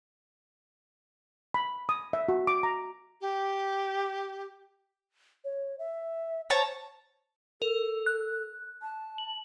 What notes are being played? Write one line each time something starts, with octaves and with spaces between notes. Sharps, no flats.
B5
D#6
E5
F#4
D6
A#5
G4
C#5
E5
C5 C#5 A5 A#5
A4 A#4
F#6
A5
F#7